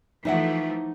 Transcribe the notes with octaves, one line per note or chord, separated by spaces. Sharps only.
E3 F3 A3 D#4 E5 F#5